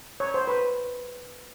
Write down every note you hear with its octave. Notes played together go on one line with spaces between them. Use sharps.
C#5
C5
B4